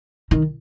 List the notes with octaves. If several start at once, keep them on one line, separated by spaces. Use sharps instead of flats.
D#3